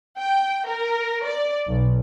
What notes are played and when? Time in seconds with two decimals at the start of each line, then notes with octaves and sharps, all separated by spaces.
0.17 G5
0.66 A#4
1.24 D5
1.66 B1